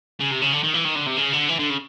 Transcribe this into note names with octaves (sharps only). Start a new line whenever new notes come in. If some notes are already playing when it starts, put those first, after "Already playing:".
C#3
C3
C#3
D3
D#3
E3
D#3
D3
C3
C#3
D3
E3
D3
C#3